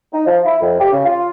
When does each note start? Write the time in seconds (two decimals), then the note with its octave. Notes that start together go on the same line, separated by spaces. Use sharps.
0.12 D#4
0.26 F3
0.45 E4
0.61 F2
0.79 G4
0.92 C#3
1.05 F4